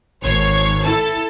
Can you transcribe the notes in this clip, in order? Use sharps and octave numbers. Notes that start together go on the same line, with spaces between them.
G#1 C#5 G#6 C7
E4 A4 A5